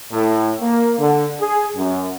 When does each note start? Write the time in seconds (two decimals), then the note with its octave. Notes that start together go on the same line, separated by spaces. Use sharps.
0.12 A2
0.61 A#3
0.99 D3
1.41 G#4
1.76 F#2